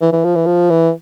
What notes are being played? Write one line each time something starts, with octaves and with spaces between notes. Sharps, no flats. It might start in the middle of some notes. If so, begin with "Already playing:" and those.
E3
E3
F3
E3
F3
E3